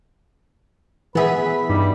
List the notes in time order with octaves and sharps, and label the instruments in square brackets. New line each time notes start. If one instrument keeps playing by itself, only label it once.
[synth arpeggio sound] E3 E5 B6 [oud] B3 G#4 [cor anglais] B4
[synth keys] G2 D#4 [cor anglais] G3